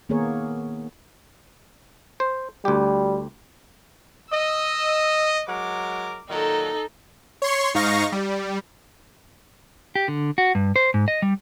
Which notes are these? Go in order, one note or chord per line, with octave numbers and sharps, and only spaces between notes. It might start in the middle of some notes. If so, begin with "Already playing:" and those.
D#3 A#3 B3 G#4 A#4 C#5
C5
D2 G3 G4
D#5 E6
F#3 G#3 A#4 D6
A#2 D#3 F#3 D#4 A4
C#5 C6 C#6
G#2 D#4 F5 C#6 A#6
G3
G4
D3
F#4
G2
C5
G#2
D#5
G3